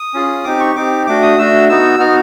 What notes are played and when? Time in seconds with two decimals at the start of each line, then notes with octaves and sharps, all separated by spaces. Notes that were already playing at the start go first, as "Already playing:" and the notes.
Already playing: D#6
0.14 C#4 F4 G#4
0.44 C4 D#4 G4 D6
0.60 C#6
0.75 C4 D#4 G4 D6
1.07 A3 D4 F#4 D6
1.22 D#6
1.38 A3 D4 F#4 E6
1.69 B3 D#4 F#4 E6
2.00 B3 D#4 F#4 F6